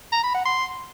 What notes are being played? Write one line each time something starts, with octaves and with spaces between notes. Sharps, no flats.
A#5
B5
F#5
C6